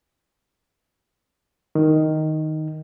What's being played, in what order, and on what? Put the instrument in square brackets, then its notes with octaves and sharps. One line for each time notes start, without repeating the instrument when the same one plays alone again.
[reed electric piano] D#3